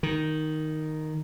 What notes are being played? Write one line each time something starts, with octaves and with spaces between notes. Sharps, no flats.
D#3